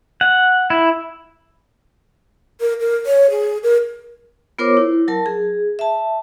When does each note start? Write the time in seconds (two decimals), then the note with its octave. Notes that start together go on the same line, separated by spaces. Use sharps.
0.21 F#5
0.70 E4
2.60 A#4
2.80 A#4
3.06 C#5
3.30 G#4
3.63 A#4
4.59 B3 F4 A#4 C5 C#5 D6
4.77 E4
5.08 F#3 A#4 A5
5.26 G#4
5.79 E5 A5